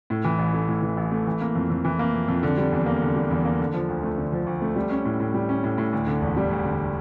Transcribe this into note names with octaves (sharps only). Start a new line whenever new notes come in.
A2
E3
A1
A3
A2
E3
A1
A3
E3
A#3
F2
F2
E3
A#3
F2
F2
D3
G3
E2
A#3
D3
G3
E2
A#3
D3
F3
D2
A3
D3
F3
D2
A3
G3
C#4
A2
A2
G3
C#4
A2
A2
D2
D3
E1
G3
D2
D3